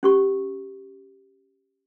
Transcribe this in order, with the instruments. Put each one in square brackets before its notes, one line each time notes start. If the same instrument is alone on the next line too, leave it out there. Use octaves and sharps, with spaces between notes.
[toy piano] C#4 G4 C#6